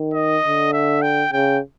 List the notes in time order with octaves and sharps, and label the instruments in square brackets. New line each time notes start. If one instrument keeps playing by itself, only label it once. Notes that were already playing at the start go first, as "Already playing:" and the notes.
Already playing: [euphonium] D#3
[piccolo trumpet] D#5
[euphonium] D3
[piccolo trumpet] E5
G5
[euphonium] C#3 [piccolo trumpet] G5